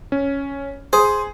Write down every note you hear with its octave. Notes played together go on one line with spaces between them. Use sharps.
C#4
G#4 C5 D#6